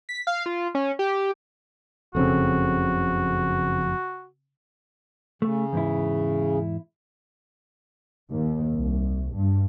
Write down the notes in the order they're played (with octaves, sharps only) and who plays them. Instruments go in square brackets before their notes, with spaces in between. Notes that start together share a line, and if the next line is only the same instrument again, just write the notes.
[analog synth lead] B6
F5
F4
C#4
G4
[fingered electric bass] F#1 F2 [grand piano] C#3 C4 A4 [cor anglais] F#4
[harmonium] C#3 [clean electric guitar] A3
[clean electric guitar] E2 G#2 E4
[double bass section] D#2
C2
G2